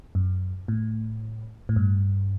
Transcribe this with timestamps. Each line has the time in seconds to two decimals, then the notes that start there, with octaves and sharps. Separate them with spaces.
0.15 F#2
0.68 A2
1.69 A2
1.76 G2